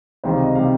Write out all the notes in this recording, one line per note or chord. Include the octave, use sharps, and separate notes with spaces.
C#2 C3 D#3 G3 C5
D#5
C3 D#3 G3 F5